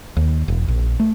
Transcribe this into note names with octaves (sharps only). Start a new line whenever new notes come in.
D#2
E1
A#1
A3